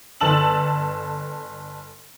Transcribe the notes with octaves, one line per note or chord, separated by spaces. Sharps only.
G1 A4 B4 A5 E6 F#7